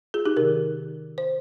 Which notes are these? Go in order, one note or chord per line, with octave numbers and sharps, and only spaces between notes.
F4 G#4
D#4 G4
C3 D#3 G4 A#4
C5